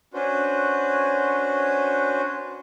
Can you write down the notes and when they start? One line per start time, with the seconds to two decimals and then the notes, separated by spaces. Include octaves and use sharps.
0.14 C#4 D4 F#4 B4 C5